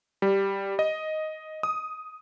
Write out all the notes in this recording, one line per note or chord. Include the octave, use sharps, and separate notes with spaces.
G3
D#5
D#6